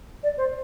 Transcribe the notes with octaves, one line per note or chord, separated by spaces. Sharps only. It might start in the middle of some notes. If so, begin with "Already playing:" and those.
D5
C5